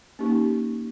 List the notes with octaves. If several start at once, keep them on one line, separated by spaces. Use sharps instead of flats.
A#3 C#4 D#4 G4 C#6